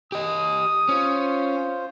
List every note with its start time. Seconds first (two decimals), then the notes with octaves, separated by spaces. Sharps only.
0.12 G4 D#5 D#6
0.89 C#4 F4 C5